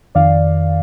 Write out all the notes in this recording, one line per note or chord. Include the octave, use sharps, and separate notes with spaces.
F2 D#3 D5 F5